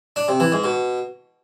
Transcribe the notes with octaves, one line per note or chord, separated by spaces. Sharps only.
D4
C3
E3
G#2
B2